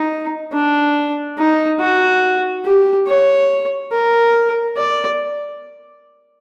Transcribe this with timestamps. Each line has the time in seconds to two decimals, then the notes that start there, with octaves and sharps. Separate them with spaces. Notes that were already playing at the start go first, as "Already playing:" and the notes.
Already playing: D#4
0.52 D4
1.38 D#4
1.80 F#4
2.65 G4
3.07 C#5
3.92 A#4
4.77 D5